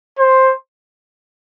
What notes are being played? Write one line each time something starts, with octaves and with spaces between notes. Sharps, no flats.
C5